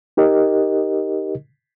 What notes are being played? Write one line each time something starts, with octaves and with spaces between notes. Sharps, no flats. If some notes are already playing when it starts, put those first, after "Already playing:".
D#4 G4 A#4 D#5